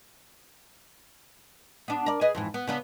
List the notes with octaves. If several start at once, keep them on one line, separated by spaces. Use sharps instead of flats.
B3 D4
A#4 D5
G#4 B4 D#5
F2 G#2 E3
B3
C#3 B3 D4